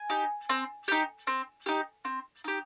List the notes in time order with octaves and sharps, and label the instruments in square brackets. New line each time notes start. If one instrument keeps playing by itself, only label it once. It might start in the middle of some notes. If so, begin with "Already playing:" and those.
Already playing: [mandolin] G#5
D#4 G4
C4
D#4 G4
C4
D#4 G4
C4
D#4 G4